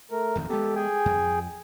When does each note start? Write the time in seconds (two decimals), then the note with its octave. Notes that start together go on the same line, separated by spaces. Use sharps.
0.11 A3 A#4
0.35 D#1 F2 D#3
0.50 G#3 B3 G4 A4
0.76 G#4 G5 G#5
1.05 F2